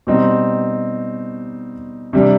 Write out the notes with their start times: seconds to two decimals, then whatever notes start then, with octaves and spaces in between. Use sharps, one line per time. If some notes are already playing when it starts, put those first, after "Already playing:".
0.07 B2 G3 C4 D#4
2.13 C3 G3 D4